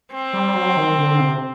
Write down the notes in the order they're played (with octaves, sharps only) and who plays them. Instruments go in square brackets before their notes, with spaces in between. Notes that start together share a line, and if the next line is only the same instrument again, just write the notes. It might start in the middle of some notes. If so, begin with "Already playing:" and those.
[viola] C4
[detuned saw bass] G3
F#3
D#3
D3
C3